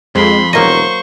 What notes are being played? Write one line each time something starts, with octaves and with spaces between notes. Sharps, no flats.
F2 G#3 B5 C6
E1 F#3 A#3 C5 D#5 C#6